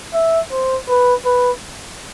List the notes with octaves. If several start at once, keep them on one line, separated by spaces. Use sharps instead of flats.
E5
C5
B4
B4